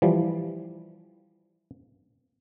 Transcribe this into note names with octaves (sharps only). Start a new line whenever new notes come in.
E3 F3 G3